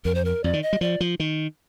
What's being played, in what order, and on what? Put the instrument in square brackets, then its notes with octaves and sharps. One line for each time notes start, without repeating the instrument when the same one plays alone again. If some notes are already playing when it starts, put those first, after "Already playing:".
[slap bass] F2 [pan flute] A#4
[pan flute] C5
A#4
[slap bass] F2 [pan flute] D5
[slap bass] D#3
[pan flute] D#5
[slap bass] G3
[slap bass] F3 [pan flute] D5
[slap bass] F3
D#3